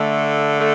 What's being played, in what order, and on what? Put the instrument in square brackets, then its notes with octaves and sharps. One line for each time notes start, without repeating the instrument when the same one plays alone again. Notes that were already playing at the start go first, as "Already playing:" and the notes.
Already playing: [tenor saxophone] D3 [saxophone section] A3
[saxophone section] A3